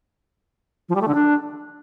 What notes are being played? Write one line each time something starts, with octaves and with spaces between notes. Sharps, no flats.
F3
G3
A3
D3
D4